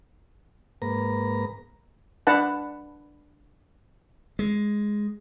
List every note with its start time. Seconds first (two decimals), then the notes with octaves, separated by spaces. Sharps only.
0.82 G#2 A#3 B4 A#5
2.27 D4 B4 F#5 A5
4.39 G#3